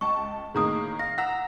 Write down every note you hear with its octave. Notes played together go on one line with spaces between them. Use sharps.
C#2 G5 A5 C#6
A2 D#3 A#3 G#4 A#5 D#6
F5 A#6
F#5 A#5 E6 A#6